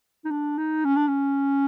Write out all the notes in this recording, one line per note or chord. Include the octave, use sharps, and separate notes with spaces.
D#4
D4
D#4
C#4
D4
C#4